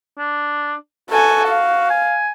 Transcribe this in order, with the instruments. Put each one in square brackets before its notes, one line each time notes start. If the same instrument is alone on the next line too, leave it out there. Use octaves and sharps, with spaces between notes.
[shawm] D4
[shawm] F#4 [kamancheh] A4 G#5
[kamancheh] F5
[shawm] G#5